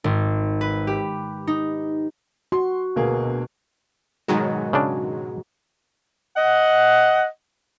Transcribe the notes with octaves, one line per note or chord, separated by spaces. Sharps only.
G#1
B4
G4
D#4
F#4 C6
D2 B2 A#3 G#4
G#2 B2 D#3 F#3 G#3 F#4
C#3 D4
D#5 F#5